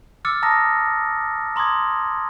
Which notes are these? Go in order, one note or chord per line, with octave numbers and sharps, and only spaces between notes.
D6 E6 F6 A6 C#7
A5 A#5 D#6 E6 A#6
A#5 C6 D6 D#6 G#6